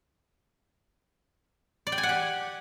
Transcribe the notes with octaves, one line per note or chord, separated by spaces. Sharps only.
D5
G5
G#5
F#5
G4